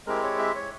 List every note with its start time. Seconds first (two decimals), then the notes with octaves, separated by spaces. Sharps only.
0.07 G#3 C4 E4 G4 A#4
0.23 C#5
0.39 E5
0.55 C#5